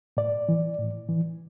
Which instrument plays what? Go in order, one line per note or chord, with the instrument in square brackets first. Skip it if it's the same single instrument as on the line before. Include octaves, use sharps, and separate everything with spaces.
[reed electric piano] A2 D5
E3
A2
E3